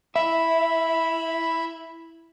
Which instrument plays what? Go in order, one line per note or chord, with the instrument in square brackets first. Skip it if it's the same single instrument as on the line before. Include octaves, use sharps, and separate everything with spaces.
[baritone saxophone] E4 [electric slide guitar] E5 [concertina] B5